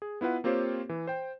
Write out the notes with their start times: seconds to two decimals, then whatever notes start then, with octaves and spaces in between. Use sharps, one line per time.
0.02 G#4
0.21 B3 E4 F4 B4 F#5
0.44 A#3 C4 F4 G4 C5 C#5
0.89 E3
1.07 C5 G5